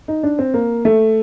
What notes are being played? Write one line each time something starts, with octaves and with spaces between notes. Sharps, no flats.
D#4
D4
C4
A#3
A3